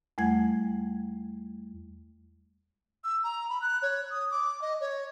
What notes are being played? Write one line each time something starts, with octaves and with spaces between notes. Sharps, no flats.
E2 G3 A3 F#5 G#6
E6
A#5
B5
F#6
C#5
D#6
D6
D#5
C#5